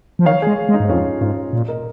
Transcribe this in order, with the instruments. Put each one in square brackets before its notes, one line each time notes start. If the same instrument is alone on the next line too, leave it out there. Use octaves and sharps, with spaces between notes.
[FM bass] F3
[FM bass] D#3 [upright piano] C#5 F5
[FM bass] G#3 [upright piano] G#4 C#5
[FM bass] G#3
[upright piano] D#4
[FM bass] G#2
[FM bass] F2 [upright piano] C#4 F4
[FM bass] G#2 [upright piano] C#4 F4
[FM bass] A#2
[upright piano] A#4 D#5